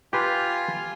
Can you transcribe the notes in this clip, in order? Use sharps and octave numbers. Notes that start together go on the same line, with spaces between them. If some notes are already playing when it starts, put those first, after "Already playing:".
F4 G4 B4 G#5 C6